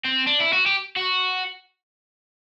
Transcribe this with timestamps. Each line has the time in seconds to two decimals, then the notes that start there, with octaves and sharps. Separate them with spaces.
0.05 C4
0.27 D4
0.40 E4
0.53 F#4
0.66 G4
0.96 F#4